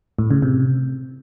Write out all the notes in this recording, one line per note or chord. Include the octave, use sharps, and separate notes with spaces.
A2
C#3
C3